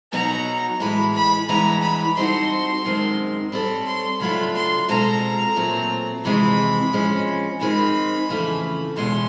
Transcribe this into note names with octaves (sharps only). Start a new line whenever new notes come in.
B2 F#3 B3 D#4 F#4 A#5
A2 E3 G#3 B5
B5
G2 E3 G#3 B3 E4 A#5
B5
G3 C4 D#4 F#4 A4 C6
F#2 D#3 G#3 C4
G3 C4 E4 A4 C#5 B5
C6
C#3 F#3 A3 D4 F4 B5
C6
B2 G#3 C4 F4 A4 A#5
A#2 F#3 A3 C4
F2 C3 E3 G#3 C4 B5
F3 G#3 C#4
D#3 G#3 C4 B5
F2 C#3 E3 A3
E2 B2 G#3 C#4 C6